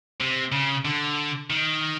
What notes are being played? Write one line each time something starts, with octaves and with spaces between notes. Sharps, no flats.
C3
C#3
D3
D#3